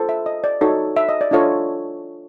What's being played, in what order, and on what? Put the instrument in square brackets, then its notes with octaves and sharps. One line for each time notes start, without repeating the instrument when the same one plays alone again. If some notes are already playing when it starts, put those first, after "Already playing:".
Already playing: [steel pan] F4 A4 C5
E5
D#5
D5
D#4 F#4 A4 C#5
E5
D#5
D5
D4 F4 A4 C#5 D#5